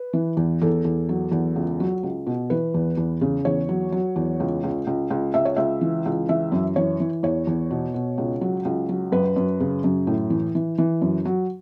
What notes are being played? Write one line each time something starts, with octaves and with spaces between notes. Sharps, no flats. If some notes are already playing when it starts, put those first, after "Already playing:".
Already playing: B4
E3
E2
E2 A4
E2
F#3
E2
C#2
F#3
C#2
B2
E3 B4
E2
E2
C#3
E2 C#5
F#3
F#3
E2
C#2
C#2
C#2
C#2
C#2 E5
C#5
C#2 E5
E3
C#2
E3 E5
F#2
E3 C#5
E3
E2 C#5
E2
B2
B2
C#2
F#3
C#2
F#3
F#2 B4
F#2
C#3
F#2
A2
E3
E3
E3
F#2
F#3